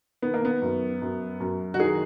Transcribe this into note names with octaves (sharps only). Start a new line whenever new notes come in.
D#3 B3
A#3
B3
F#2
F#2
F#2
F#4
D#3 G#4